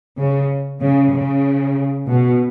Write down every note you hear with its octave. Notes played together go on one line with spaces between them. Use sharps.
C#3
C#3
C#3
B2